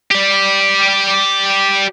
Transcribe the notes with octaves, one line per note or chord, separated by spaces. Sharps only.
G4 D5